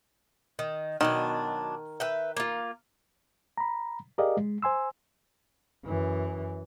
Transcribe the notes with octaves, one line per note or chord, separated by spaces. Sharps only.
D#3
B2 D#3 F#3 D4
B4 E5 G5
A#3 F4
A#5 B5
G4 G#4 A#4 D5 D#5 F5
G#3
C5 G#5 C6 E6
F#2 E3